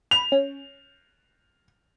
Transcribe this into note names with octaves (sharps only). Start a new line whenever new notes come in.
B5 F7
C#4